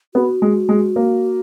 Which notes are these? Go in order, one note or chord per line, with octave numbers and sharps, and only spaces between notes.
B3 F#4
G#3
G#3
A#3